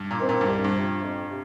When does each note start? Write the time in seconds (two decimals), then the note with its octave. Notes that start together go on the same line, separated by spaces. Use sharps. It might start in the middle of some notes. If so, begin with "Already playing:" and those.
Already playing: G2
0.11 A#2
0.19 D#3 C4
0.29 A#2
0.41 G2
0.46 C2
0.64 G2
0.75 C3 F3
1.02 F2
1.29 C3